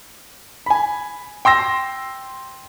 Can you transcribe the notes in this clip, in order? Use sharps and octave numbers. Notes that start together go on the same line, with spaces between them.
G#5 B5
G5 C6 E6 A#6